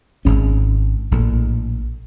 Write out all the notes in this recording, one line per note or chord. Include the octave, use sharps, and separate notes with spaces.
G#1 G#2 C#4
A#1 A2